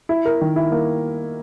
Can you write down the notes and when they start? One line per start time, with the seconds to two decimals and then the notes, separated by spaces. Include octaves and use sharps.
0.09 E4
0.25 A#4
0.41 D#3
0.56 E4
0.72 A#3